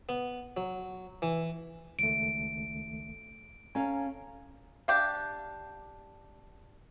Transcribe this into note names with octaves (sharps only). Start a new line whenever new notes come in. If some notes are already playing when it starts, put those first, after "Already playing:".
B3
F#3
E3
C#2 D#3 A3 D7
C#4 A4 F5 G#5 A#5
D4 G4 F5